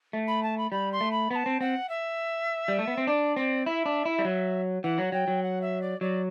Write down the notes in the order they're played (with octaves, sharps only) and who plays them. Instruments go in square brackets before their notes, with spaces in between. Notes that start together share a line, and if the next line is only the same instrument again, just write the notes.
[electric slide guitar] A3
[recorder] B5
A5
B5
[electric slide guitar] G3 [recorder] B5
[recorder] C6
[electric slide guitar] A3
[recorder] B5
[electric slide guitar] B3 [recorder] B5
[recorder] A5
[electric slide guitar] C4
[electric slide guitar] C4 [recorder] F#5
[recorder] E5
[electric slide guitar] G3
A3
B3
C4
[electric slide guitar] D4 [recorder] D5
[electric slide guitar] C4 [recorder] D5
[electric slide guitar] E4 [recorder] E5
[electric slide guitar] D4
E4
G3
F#3
[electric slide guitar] E3 [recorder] F#5
[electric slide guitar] F#3
[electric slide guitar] F#3 [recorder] G5
[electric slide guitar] F#3
[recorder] F#5
E5
D5
[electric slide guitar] F#3 [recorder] D5